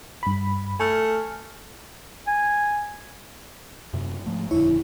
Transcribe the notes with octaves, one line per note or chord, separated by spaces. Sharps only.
G2 B5
A3 G#5 F6
G#5
F#2 C3
G#2 F3 A3
D#1 F2 D3 E4 C#5